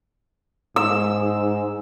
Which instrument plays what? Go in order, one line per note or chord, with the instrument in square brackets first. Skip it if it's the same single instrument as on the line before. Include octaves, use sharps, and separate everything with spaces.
[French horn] G#2 [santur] E6